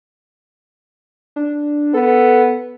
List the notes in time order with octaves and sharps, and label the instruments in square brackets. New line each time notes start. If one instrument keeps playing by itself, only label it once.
[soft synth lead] D4
[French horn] B3 [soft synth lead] A4